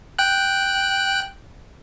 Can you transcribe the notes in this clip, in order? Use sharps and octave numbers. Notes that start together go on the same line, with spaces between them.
G5 F#6